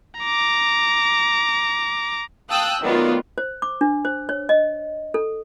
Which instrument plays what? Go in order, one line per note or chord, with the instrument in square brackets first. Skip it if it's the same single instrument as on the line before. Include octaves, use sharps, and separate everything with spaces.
[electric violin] A#5 D6
[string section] F5 G5 A5 D#6 E6 F#6
D#3 F#3 A3 B3 F4 D5
[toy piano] C5
D6
D4
C5
C#5
D#5
A4